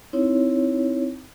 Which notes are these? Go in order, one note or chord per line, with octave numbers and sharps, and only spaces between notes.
C4 D#4 E4 C#5